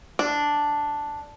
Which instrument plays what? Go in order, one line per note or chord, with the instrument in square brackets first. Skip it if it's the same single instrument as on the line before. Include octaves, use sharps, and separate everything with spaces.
[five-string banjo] D4